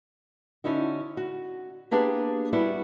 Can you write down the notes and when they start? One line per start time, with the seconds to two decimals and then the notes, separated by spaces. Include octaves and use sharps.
0.64 D3 C#4 D#4 E4 F#4
1.17 F#4
1.91 A#3 B3 D4 G4 G#4 B4
2.53 G3 B3 E4 F#4